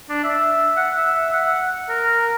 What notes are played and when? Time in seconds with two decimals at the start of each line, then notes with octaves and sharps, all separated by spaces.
0.09 D4
0.24 E5
0.76 F#5
0.97 E5
1.33 F#5
1.89 A#4